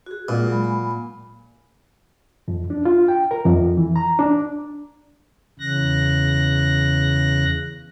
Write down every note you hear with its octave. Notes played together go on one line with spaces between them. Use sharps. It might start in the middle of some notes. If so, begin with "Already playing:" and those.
F#4 G#4
A#2 G#3 F#5
F#3 G#3 B5
G#5 B5
F2
D4
F4
G5
A#4
F2
E3
A#5
D4
E2 C#3 F#6 A#6